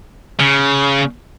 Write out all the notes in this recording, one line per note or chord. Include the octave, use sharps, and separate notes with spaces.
C#3